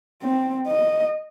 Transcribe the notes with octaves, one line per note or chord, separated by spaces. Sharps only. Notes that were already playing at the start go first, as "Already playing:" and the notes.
C4
D#5